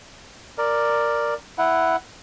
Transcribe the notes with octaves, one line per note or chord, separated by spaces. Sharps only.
A#4 D5
E4 F#5